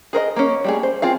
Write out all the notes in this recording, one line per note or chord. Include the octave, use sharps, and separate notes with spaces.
G#4 A#4 C5 D#5
A#3 C#4
G3 A3 G#4
C5
C4 F4 G#4 F5